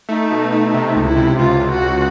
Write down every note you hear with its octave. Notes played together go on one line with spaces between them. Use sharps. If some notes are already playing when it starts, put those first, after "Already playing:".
A3 D#4
B2
A3
C3 D#4
C#2
E4
C3
C#2 F4
C#2
F#4
C#2